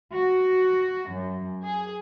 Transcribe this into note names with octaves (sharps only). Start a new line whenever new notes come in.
F#4
F#2
G#4